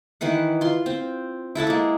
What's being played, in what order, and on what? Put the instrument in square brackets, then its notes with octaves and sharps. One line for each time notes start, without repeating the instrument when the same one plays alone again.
[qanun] D#3 E3 B4 F#5
F4 C6
C4
E4 A4 F#5 A5
G#3 A#3